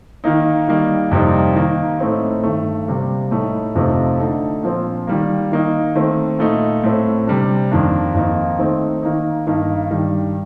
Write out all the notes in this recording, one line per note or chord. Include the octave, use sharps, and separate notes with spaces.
D#3 A#3 D#4
D#3 G3 A#3 D#4
F2 C3 G3 A#3 D#4
D#3 A#3 D#4
A2 A3 C4 D#4
G2 D#3 A3
C3 G3 A#3
A2 A3 D#4
F2 C3 F3 A3 D#4
D3 A3 D#4
A#2 F3 C4
D#3 G3 A#3
D#3 A#3 D#4
D#3 A3 C4
A#2 A3 D#4
A2 A3 C4
C3 G3 D4
F2 D#3 A#3 D4
F2 D#3 A#3 D#4
D#3 A3 C4 D#4
D#3 A#3 D#4
G2 D#3 A#3 D#4
G2 D#3 G3